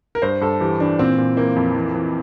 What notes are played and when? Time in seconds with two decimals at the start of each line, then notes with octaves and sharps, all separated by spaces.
0.15 A#4
0.22 G2 C5
0.41 G2 A4
0.60 E3 G4
0.79 E3 D4
0.99 A#2 C4
1.18 A#2
1.37 E3 A#3
1.56 F2
1.76 E3
1.95 E3